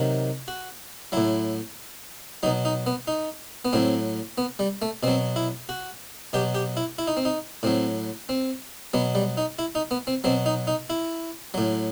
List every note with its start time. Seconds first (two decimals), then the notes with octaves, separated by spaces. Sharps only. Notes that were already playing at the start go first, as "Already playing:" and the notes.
Already playing: C3 D#3 F#3
0.48 F#4
1.12 A2 F#3 E4
2.43 F#3 D#4
2.46 B2
2.65 D#4
2.86 B3
3.07 D#4
3.65 B3
3.73 A2 F#3 C4
4.38 B3
4.59 G3
4.82 A3
5.03 B2 F#3 C4
5.36 E4
5.69 F#4
6.33 B2 F#3 G4
6.55 G4
6.77 E4
6.98 E4
7.07 D#4
7.17 C4
7.25 D#4
7.63 A2 F#3 C4
8.29 C4
8.93 B2 F#3 B3
9.15 G3
9.37 D#4
9.59 E4
9.75 D#4
9.91 B3
10.07 C4
10.24 B2 F#3 C4
10.46 D#4
10.67 D#4
10.90 E4
11.54 A2 F#3